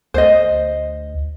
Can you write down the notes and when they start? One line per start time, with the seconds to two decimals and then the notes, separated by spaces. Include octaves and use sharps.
0.14 D2 C5 D#5